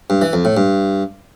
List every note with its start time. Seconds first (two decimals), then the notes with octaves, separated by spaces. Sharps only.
0.10 G2
0.22 E3
0.33 F2
0.45 A2
0.57 G2